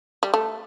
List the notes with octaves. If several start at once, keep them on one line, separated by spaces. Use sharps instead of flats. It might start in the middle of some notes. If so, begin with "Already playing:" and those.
G3
A3